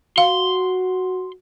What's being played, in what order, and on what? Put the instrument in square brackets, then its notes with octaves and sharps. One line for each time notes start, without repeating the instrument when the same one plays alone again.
[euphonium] F#4 [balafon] F5 [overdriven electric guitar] C6